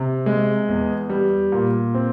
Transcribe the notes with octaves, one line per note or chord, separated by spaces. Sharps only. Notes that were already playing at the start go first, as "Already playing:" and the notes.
Already playing: C3
G#3
E2
G3
A#2
C4